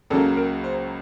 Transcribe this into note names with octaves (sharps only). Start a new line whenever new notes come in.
C#2 C#3 F#3 A#3 A4
A#4
C5